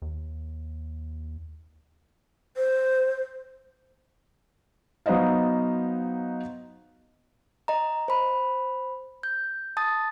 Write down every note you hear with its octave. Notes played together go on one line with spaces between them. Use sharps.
D#2
C5
F#3 B3 D#4 C5 D#5 F5
D#5 A#5
C5 B5
G6
A5 D#6 A6